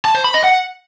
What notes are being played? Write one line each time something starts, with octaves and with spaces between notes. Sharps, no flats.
A5
C5
B5
D#5
F#5